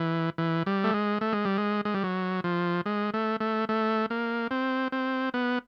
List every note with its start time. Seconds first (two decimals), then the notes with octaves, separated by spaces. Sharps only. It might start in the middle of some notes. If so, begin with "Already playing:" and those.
Already playing: E3
0.38 E3
0.66 G3
0.84 A3
0.94 G#3
1.21 A3
1.33 G#3
1.45 G3
1.57 G#3
1.85 G#3
1.94 G3
2.03 F#3
2.44 F3
2.86 G#3
3.14 A3
3.40 A3
3.69 A3
4.10 A#3
4.51 C4
4.92 C4
5.34 B3